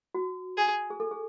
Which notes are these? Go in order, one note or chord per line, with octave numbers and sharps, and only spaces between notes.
F#4
G#4
G#4
A4
G#4